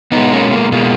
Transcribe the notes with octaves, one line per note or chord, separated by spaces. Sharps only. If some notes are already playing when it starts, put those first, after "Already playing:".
B2 G#3 B3 D#4
A#3 C#4
A#3
B2 G#3 A#3